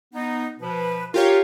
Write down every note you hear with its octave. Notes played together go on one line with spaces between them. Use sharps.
B3 D#4
B2 F3 B4
F4 G4 A#4 C#5 F5